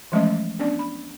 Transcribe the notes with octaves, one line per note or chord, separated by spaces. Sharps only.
E3 F3 G#3 A3 C#4 D#5
B3 C#4 D4 D5
B5